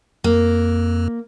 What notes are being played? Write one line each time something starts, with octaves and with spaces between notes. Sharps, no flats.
F2 A#3